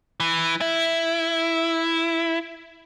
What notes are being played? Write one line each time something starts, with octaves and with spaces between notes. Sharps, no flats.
E3
E4